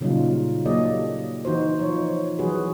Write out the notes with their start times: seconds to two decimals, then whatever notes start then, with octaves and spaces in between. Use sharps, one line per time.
0.01 A#2 C#3 F#3 G3 D#4 F4
0.66 F#3 A#3 G4 A4 D5 D#5
1.45 E3 D#4 F#4 C5
1.79 F3 C#5
2.39 E3 F#3 B3 F#4 G#4 B4